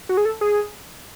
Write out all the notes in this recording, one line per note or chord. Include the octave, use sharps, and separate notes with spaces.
F#4
G#4
A4
G#4